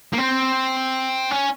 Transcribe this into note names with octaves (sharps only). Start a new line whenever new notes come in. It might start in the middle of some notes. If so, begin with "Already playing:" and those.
A#3
C4
C#4